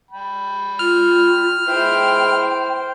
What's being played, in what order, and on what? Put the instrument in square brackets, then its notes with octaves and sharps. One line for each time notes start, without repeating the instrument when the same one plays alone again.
[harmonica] G5 B5
[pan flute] F4 [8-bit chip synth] F6
[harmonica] G#3 E4 [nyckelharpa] C5 [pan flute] G5